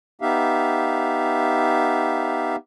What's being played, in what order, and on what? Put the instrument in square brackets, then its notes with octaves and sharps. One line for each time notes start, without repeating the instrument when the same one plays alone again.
[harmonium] B3 D#4 G4 E5 F5